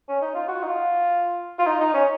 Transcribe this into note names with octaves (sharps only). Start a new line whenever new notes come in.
C#4
D#4
F4
F#4
D#4
F4
F4
D#4
D#4
C#4